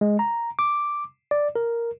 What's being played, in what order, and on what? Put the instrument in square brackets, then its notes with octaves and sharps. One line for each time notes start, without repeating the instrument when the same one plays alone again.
[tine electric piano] G#3
A#5
D6
D5
A#4